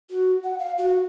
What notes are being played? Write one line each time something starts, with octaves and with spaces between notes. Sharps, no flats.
F#4
F#5
F5
F#4